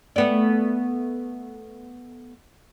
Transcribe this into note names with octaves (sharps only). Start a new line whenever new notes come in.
A3 B3 D5